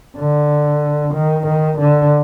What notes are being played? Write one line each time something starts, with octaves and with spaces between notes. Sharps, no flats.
D3
D#3
D#3
D3